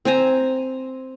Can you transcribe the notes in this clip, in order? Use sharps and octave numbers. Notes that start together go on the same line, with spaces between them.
C4 C5 G#5 A#5